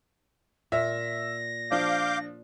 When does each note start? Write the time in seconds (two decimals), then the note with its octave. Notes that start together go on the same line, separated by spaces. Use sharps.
0.72 A#2 E5 A#6
1.71 F3 D4 F5 D6 G6